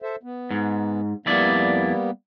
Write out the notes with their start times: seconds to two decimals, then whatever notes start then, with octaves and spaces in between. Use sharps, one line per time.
0.02 A4 C5 E5
0.23 B3
0.51 G#2
1.26 F2 G3 A#3 B3 E4 D5